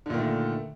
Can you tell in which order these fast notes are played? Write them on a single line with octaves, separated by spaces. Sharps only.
D3 A#2 D#3 A3